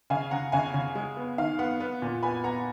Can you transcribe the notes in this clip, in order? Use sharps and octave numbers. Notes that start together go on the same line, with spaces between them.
C#3 F5 G#5
C#3 F#5 A#5
C#3 F5 G#5
C#3
G#3
B3
D#3 F5
B3 F#5
B3
A#2
B3 G#5 B5
B3 F#5 A#5